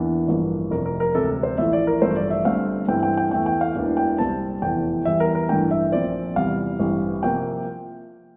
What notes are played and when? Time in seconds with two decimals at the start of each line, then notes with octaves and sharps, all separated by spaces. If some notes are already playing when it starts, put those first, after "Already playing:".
Already playing: E2 E3 A#3 D4
0.28 A1 G2 F3 A#3
0.71 F1 F2 C3 A#4
0.85 A#4
1.00 A#4
1.15 E1 D2 C3 A4
1.43 C5
1.58 A1 A2 F3 E5
1.73 D5
1.87 A#4
2.02 A1 G2 F3 A3 C5
2.16 D5
2.30 E5
2.45 G1 G2 D3 A3 C4 F5
2.88 G2 E3 A3 C4 G5
3.03 G5
3.17 G5
3.31 E2 E3 A3 G5
3.46 G5
3.61 F5
3.76 E1 E2 E3 A#3 D4
3.97 G5
4.18 C2 A#2 G3 C4 A5
4.62 F1 E2 E3 G5
5.05 E2 E3 G3 E5
5.20 A#4
5.35 A#4
5.49 A1 G2 E3 A3 D4 G5
5.71 E5
5.92 A#1 A#2 F3 C4 D5
6.36 E2 C3 G3 F5
6.79 A1 G2 E3 G3 C4
7.23 C3 F3 A#3 G5